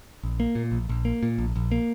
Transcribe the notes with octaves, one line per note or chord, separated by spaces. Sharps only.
A#1
A#3
A#2
A#1
A#1
A#3
A#2
A#1
A#1
A#3